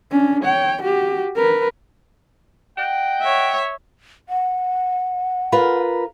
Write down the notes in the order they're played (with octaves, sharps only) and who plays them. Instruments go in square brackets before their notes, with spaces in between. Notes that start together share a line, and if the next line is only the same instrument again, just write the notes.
[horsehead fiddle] C#4 D4
C#5 G5
F#4 G4
A#4 B4
[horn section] D#5 F#5 G5
[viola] C#5 E5
[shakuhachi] F#5
[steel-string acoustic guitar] F4 A#4 B4